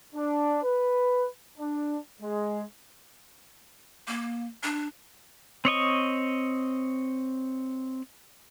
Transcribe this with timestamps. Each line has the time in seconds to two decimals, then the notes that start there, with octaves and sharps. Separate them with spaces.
0.15 D4
0.64 B4
1.58 D4
2.21 G#3
4.08 A#3
4.63 D4
5.65 C4 C#5 D#5 C#6